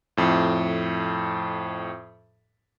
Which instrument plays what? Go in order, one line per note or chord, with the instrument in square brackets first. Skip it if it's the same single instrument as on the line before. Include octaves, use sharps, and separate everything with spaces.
[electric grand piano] F2 A2